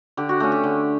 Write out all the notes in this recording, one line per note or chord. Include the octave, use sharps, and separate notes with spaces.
D3 G4
F#4
A3 C#4 G4
G4
D3